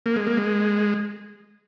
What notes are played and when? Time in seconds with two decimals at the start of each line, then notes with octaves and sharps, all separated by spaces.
0.06 A#3
0.16 G#3
0.27 A#3
0.37 G#3